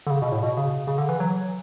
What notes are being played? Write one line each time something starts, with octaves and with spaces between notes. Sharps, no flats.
D3
C#3
B2
A2
B2
C#3
C#3
D3
E3
F#3